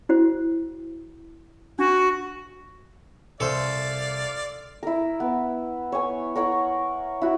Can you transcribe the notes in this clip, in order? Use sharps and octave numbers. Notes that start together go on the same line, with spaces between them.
E4 F#4 C5
D4 F#4
C2 A4 C5 D5 F5
E4 A#4
B3
C#5 G#5
A#4 C#5 F#5
E4 F#4